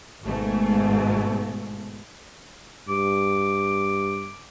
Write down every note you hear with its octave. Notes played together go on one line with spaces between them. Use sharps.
G#1 G#2 B2 A3
G2 D6